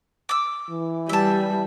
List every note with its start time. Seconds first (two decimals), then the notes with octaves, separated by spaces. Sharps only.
0.29 D6 E6
0.70 E3
1.09 G3 E5 A5